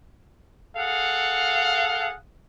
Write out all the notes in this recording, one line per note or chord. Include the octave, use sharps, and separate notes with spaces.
G#4 A4 F5 F#5